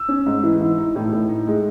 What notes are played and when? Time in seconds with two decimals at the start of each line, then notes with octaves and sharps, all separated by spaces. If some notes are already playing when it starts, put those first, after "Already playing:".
Already playing: E6
0.08 C#4
0.26 G#2
0.43 E3
0.61 E3
0.78 D#4
0.95 A2
1.12 A2
1.29 D#4
1.47 G#3